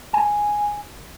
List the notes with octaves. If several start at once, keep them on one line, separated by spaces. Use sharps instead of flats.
G#5